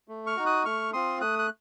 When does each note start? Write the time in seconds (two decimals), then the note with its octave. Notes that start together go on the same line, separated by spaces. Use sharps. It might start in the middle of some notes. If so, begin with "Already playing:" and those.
0.08 A3
0.27 C#6 F6
0.36 D#4 F#4
0.46 D#6 F#6
0.65 A3 C#6 F6
0.93 C4 F4 C6 D#6
1.21 A3 D#6 F#6
1.39 F#6